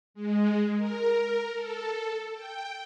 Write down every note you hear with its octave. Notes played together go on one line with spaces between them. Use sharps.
G#3
A#4
A4
G5